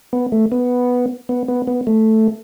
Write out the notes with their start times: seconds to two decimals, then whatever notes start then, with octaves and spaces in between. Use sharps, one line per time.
0.13 B3
0.32 A3
0.52 B3
1.29 B3
1.48 B3
1.67 B3
1.87 A3